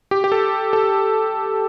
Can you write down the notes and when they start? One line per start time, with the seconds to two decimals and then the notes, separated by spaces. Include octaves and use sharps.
0.11 G4
0.24 G4
0.32 A4
0.73 A4